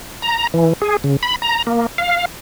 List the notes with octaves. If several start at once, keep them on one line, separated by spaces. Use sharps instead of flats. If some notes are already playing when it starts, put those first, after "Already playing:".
A#5
E3
G#4
C#3
B5
A#5
A#3
F5